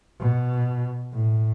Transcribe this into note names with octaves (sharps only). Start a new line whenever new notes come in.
B2
A2